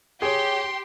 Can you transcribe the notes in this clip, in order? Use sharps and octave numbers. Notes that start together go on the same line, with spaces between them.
G4 G#4 C#5 C6